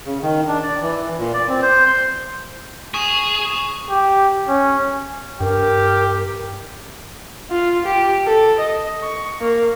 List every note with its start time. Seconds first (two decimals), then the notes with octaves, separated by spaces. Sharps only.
0.05 C#3
0.22 D#3
0.48 D4
0.63 D5
0.81 E3
1.18 A#2
1.34 D5
1.48 C4
1.62 C5
1.86 C6
2.94 G#4 C#6 D#6 E7
3.90 G4
4.49 C#4
5.41 G2 G4 A#4
7.50 F4
7.85 G4
8.26 A4
8.59 D#5
9.02 C#6
9.40 A#3